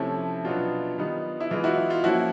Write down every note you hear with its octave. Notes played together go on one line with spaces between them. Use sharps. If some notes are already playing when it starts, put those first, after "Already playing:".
Already playing: C3 F3 A3 C#4 E4
B2 F#3 B3 D4 F4
D#3 G3 B3 D#4
E4
E3 G#3 B3 D#4 F4
E4 F#4
E4
F4
F3 A#3 C#4 E4 F#4